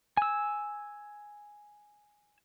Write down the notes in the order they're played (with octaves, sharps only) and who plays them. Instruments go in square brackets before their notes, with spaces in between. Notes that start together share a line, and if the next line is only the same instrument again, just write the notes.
[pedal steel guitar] G#5 E6